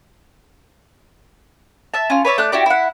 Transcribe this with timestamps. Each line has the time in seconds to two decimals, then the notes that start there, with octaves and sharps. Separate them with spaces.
1.94 E5 A5
2.10 C#4 F4
2.25 B4 C#5 D5 E5
2.38 A3 D5 F#6
2.52 E4 F#4 G4 D5
2.66 E4 F#5